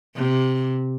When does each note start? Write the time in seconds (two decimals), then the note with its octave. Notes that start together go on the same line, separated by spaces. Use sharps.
0.16 C3